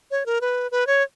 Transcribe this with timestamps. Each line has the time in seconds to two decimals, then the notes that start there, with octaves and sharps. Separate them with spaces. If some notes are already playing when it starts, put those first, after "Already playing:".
0.11 C#5
0.26 A#4
0.41 B4
0.71 B4
0.87 C#5